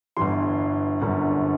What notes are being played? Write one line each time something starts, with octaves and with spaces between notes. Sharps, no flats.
G1 G2 E3 C6
G1 F#2 D3